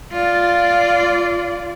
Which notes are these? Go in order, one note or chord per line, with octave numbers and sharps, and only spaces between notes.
F4 D5